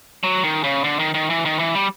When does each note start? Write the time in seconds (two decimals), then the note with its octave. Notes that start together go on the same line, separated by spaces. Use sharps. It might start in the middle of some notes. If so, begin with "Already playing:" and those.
0.23 F#3
0.44 D#3
0.64 C#3
0.84 D3
0.99 D#3
1.14 D#3
1.30 E3
1.45 D#3
1.59 E3
1.75 G3